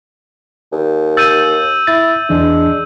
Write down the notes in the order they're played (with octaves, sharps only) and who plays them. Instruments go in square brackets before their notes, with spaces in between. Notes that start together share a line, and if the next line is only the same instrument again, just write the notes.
[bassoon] D#2
[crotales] E6 G6 D#7 [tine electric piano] A6
[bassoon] E4 [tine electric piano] A6
[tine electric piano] E2 E3 [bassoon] G#3 [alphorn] D4